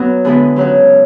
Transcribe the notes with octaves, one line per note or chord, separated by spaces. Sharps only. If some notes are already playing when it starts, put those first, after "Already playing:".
Already playing: F#3 B3 F#4
D3 G#3 B3 E4
C#3 F#3 C#4 F#4